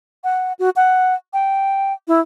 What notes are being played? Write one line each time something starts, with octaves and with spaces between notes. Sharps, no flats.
F#5
F#4
F#5
G5
E4